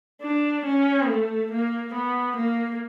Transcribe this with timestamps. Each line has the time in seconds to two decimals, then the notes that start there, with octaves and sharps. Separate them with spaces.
0.22 D4
0.65 C#4
1.07 A3
1.51 A#3
1.94 B3
2.37 A#3